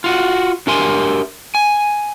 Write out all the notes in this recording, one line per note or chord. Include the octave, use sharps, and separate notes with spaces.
F4 F#4
D4 G4 A#4 E5 G#5 C6
G#5